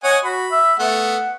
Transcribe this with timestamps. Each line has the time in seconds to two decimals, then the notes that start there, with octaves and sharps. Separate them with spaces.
0.04 C#5 D#5 F#5 G#5
0.25 F#4 B5
0.51 E5
0.79 A3 B3 F#5